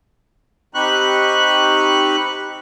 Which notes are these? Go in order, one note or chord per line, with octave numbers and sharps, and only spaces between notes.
C4 D#4 G4 B5 C#6 F#6